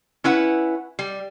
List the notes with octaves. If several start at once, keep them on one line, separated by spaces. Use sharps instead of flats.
C#4 E4 B4 F#5
G3